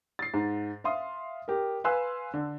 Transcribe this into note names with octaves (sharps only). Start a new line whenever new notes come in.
A6 C7
G#2
E5 F5 C6 D#6
G4 A#4
B4 F5 G#5 C6 E6 F#6
D3